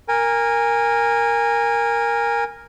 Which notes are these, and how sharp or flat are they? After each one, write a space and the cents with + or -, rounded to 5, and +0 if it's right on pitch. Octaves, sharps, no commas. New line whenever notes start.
A#4 +0 G#5 -25